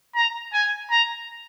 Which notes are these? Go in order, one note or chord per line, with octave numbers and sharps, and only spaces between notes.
A#5
G#5
A#5